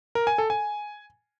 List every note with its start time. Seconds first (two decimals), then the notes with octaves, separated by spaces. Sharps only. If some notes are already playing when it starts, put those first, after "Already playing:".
0.15 A#4
0.27 G#5
0.38 A4
0.50 G#5